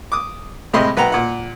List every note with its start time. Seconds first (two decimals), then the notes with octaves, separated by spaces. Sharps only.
0.12 D6 D#6
0.73 A2 C3 G#3 D#5 B5 C6
0.97 B1 B4 F#5 G5 A#5
1.12 A#2 F#5